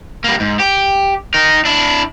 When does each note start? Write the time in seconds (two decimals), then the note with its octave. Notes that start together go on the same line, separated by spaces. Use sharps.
0.24 G3 A#3
0.40 G#2
0.60 G4
1.34 D#4 A#4
1.65 D4 E4